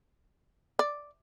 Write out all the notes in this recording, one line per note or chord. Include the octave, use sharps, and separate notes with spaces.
D5